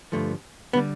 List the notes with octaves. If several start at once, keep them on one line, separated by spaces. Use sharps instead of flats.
G2 D3 F3 A3
D3 G3 B3